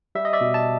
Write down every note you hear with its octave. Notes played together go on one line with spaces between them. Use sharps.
G3 E5
D#5
D5 E5
B2
A5